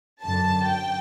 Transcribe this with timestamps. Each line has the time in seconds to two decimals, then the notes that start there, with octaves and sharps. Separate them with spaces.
0.22 F#2 D3 A5
0.67 G5